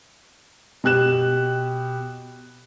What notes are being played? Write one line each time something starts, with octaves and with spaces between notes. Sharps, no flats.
B2 G4 F#6 E7